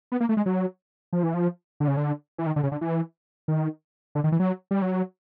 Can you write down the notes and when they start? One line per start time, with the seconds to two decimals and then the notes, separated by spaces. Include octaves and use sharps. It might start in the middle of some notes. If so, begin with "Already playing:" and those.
0.12 B3
0.20 A#3
0.29 A3
0.37 G#3
0.46 F#3
1.13 F3
1.23 E3
1.34 F3
1.80 D3
1.88 C#3
1.97 D3
2.38 E3
2.46 D#3
2.56 D3
2.63 C#3
2.72 D3
2.81 E3
3.48 D#3
4.15 D3
4.24 D#3
4.32 E3
4.39 F#3
4.71 G3
4.82 F#3